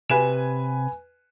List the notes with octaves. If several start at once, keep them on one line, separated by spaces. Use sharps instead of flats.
C3 B4 G#5 E7